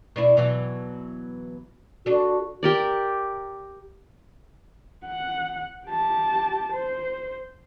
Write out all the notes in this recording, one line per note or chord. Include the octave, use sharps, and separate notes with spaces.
B2 D4 E4
B2 E3 F#3
D4 F#4 A4
G4 A#4 D5
F#5
G4 A5
C5